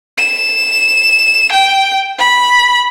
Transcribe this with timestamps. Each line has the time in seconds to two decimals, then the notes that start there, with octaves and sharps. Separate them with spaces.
0.18 E7
1.52 G5
2.19 B5